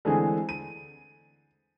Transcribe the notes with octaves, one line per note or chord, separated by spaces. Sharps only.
D3 E3 G#3 A3 C4 G#4
D#7